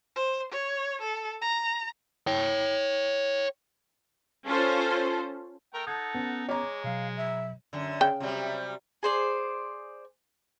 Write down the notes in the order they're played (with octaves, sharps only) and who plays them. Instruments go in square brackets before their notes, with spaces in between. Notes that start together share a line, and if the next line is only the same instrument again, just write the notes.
[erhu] C5
C#5
A4
A#5
[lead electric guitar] C#5 G5
[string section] C#4 F4 A4 C5
[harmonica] A3 A#4 G5
[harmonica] D#4 F#5 A5 [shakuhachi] A4 [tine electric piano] D#6 G6 G#6
[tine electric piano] B3 C#4
[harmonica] G#3 [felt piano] C#5 A#5 [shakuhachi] D6
[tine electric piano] B2 F#3 [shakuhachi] F5
[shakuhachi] E5
[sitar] F#2 D3
[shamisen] C#3 G5
[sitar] C3 F#3 G3
[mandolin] G#4 C5 D5